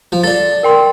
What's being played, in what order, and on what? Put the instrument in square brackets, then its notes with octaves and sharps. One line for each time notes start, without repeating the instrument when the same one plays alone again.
[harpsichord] F3
[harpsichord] D4 A4 [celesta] A6
[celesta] A#4 G5 C6